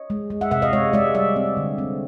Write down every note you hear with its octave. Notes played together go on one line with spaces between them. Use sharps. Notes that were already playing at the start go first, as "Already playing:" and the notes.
Already playing: C#5 D#5
G#3
G#3
E5 F#5
C3 E5 F#5
D#5 F5
G#3 C#5 D#5
G#3 D5 E5
G3 D5 E5
C4
D3
C4